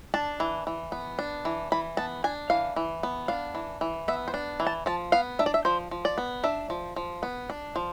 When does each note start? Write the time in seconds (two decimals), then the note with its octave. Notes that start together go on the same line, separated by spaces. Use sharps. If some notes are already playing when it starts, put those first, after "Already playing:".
0.14 D4 A5
0.40 E3
0.67 E3
0.92 B3
1.19 D4
1.45 E3
1.72 E3 B5
1.97 B3 A5
2.24 D4 G#5
2.50 E3 F5
2.76 E3
3.03 B3
3.28 D4 F5
3.55 E3
3.81 E3
4.08 B3 E5
4.28 C5
4.34 D4
4.60 E3
4.67 A5
4.86 F3 A5
5.12 B3 F5
5.39 D4 E5
5.46 D5
5.54 E5
5.65 F3 C5
5.91 F3
6.05 D5
6.18 B3
6.43 D4 E5
6.70 F3
6.96 F3
7.23 B3
7.50 D4
7.76 F3